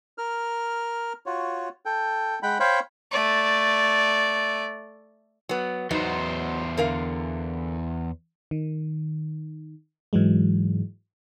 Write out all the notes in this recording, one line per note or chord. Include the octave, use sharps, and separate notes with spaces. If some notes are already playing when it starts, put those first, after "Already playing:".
A#4 F6
F4 F#4 C#5
A4 G5
G#3 F#5 G5 B5
C5 C#5 F5 G5 B5 C#6
A3 D5
F#3 B3
E2 F#3 B3 D#4 C5
D3 A#4 F5
D#3
G#2 E3 F#3 G#3